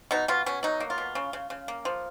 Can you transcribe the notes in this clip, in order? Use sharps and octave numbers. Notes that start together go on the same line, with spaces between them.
B2 D#4
B2 F4
B2 C#4
F#3 D#4
A#3
F4
B2
C#3
C#3
C#3
A#3
F3